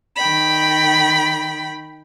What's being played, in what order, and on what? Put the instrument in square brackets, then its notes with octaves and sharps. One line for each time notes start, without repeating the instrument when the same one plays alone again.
[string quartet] D#3 G5 B5